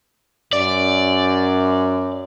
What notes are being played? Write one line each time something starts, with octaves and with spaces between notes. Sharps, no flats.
F#2 D5